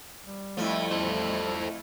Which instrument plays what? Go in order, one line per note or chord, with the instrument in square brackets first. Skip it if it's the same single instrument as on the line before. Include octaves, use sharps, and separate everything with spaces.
[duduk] G3
[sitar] F2 F3 [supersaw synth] A3 E4
[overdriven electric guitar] A4 C5